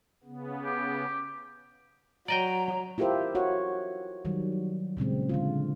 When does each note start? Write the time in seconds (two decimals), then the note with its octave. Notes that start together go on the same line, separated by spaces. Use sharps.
0.24 C#3 B3
0.65 G4
2.28 F#3 D5 D#5 G5 A#5
2.98 E4 F4 G4 A#4 C5 E5
3.35 F#4 C#5 F#5
4.25 D#3 F#3 G3
4.97 A#2 C#3 G#3 C4
5.29 D3 G#3 F4